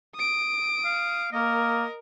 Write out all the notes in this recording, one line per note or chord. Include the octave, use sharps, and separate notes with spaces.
D#6 D7
F5
A#3 A#4 D#5